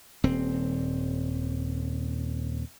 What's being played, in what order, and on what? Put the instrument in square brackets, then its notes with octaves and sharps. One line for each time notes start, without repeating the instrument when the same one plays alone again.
[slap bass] D#1 C4